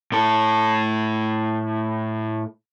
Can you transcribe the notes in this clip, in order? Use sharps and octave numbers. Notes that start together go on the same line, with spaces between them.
A2 A4